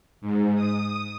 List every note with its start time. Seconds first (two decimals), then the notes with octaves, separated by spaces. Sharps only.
0.21 G#2
0.55 D#6